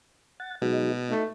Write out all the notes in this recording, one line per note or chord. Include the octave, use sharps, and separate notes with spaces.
F#5 A6
B2 F#3 G#3 D#4
A3 D#4